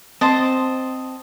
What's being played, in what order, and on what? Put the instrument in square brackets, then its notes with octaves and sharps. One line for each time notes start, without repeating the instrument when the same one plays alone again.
[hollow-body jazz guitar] C4 [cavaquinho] C5 D#5 A5